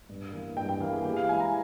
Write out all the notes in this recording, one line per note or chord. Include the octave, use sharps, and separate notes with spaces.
G2
E3 A#3
G2 G5
G5
E3 A#3 F5
G#4
E3 G4
F5
G#3 E4 G#5
A#5